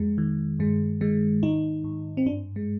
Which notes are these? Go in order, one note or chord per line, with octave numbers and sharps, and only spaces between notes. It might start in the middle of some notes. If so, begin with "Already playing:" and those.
Already playing: F2 G#3
D#3
G2 G#3
D#3 G#3
G#2 D#4
G#2
C4
G2 D4
G#3